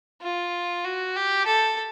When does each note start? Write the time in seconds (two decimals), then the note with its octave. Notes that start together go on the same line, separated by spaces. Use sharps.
0.22 F4
0.84 F#4
1.16 G4
1.46 A4